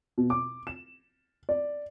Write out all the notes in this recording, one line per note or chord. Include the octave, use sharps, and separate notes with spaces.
B2
D6
E7
D5